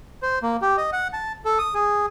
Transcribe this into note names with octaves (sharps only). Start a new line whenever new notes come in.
C5
A#3
G4
D#5
F#5
A5
A4
D#6
G#4